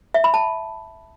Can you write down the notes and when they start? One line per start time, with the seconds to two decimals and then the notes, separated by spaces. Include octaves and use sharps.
0.14 E5
0.24 B5
0.34 A5